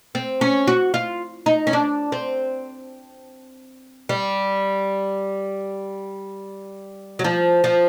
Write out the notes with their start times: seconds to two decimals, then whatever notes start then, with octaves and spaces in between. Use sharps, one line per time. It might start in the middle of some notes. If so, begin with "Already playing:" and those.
0.15 C4
0.41 C#4
0.67 F#4
0.94 F4
1.46 D#4
1.67 C#4
1.73 D4
2.12 C4
4.09 G3
7.19 F#3
7.24 F3
7.64 F3